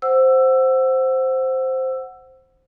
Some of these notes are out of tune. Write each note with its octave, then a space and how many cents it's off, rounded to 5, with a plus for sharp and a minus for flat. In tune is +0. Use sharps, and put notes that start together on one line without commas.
C5 +0 F#5 +0 E6 +15